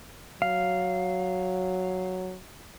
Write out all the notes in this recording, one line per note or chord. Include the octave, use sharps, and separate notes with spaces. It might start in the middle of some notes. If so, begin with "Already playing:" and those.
F#3 F5